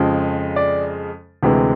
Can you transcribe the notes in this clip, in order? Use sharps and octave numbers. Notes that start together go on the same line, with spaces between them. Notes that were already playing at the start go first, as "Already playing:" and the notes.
Already playing: F2 C#3 F3 G#3
D5
D2 C3 E3 G#3